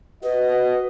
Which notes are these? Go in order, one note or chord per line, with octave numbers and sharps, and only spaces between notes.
F#4 B4 D#5